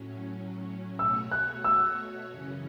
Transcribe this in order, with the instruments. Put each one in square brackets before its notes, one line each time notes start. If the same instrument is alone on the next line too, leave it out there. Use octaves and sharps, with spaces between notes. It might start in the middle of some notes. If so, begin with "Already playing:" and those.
Already playing: [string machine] A2 F#3 C#4
[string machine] B2 A3 F#4 C#5 [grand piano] E6
[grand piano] F#6
E6
[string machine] F#2 C#3 E3 C#4